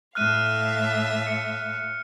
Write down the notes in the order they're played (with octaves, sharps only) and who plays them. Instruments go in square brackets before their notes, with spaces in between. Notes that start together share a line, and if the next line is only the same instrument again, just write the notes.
[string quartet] A2 E5 F5 [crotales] F6 F#6 D#7
[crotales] C#7